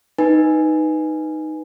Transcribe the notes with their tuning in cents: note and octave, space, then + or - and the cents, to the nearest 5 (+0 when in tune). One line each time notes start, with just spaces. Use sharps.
D#4 +0 B4 +0 G#5 +0